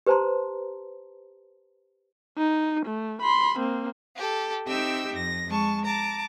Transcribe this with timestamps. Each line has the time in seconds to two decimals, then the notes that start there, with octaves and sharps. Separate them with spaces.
0.06 G4 B4 C5 A5 A#5 C6
2.38 D#4
2.86 A3
3.22 B5 C6
3.59 A#3 C4
4.15 G4 A4
4.66 C4 D#4 G4 E5 G5 E6
5.13 F2 A#6
5.47 G#3 A5 C#6
5.84 A5 A#5 D6